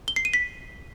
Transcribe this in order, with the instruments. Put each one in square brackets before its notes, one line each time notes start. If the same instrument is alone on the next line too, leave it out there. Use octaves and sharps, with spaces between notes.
[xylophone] G7
C7
D#7
B6